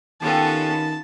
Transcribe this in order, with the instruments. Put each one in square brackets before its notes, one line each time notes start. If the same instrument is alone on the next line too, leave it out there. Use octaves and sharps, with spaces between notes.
[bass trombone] D#3 [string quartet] B3 C#4 F4 [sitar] G4 A4 [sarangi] A5